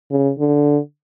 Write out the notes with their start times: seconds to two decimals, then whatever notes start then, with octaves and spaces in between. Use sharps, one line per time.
0.11 C#3
0.39 D3